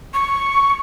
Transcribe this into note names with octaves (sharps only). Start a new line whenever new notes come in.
C#6